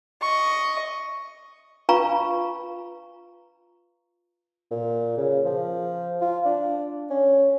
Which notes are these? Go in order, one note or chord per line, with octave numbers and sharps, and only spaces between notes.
D#5 C#6
F4 B4 F5 A#5 B5 C#6
A#2
C#3
F3
F4
D4
C#4